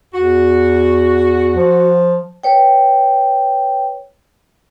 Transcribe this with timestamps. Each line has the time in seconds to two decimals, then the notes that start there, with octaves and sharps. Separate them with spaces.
0.13 E2 F#4
1.56 F3
2.43 B4 C#5 G5